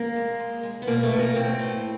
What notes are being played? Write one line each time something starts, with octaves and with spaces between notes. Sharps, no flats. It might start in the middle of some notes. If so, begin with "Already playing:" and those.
Already playing: A#3
G#3
G#3
G#3
B3
B2 A#3
A3
B2
A#3
A2 C4
A2